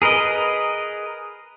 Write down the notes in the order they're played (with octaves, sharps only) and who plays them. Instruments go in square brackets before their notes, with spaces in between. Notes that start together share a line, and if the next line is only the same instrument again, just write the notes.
[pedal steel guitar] G#4 A#4 B4 D#5